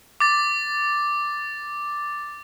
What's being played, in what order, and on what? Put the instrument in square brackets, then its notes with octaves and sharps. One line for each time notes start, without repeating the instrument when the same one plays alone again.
[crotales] D6 A6